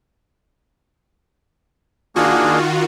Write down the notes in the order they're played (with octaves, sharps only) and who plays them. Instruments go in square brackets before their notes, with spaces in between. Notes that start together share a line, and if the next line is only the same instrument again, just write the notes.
[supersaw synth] D#3 F4 F#4 [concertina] A#3 D4 G#4